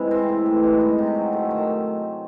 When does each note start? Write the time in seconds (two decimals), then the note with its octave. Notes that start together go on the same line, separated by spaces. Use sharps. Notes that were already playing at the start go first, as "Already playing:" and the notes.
Already playing: C3 E3 G#3
0.11 C4
0.29 A2
0.46 E3
0.63 G#3
0.81 D#4
0.98 C3
1.15 F#3
1.33 A3
1.51 D#3